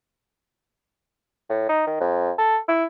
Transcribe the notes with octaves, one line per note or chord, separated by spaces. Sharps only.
A2
D#4
D#3
F2
A4
E4